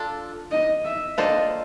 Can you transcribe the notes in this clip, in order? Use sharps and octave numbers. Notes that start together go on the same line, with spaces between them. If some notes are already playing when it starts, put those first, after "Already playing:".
Already playing: D4 F4 A4
D#5
E5
A#3 D4 F4 A4 C5 D#5